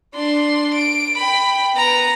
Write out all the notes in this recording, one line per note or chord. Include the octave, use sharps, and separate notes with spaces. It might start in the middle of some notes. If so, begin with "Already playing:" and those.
D4 C6
D7
G5 B5
B3 A#5